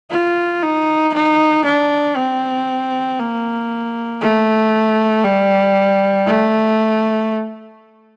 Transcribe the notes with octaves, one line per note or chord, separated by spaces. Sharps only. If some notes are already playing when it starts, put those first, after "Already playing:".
F4
D#4
D#4
D4
C4
A#3
A3
G3
A3